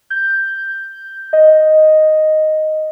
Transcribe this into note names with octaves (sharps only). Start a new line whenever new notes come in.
G6
D#5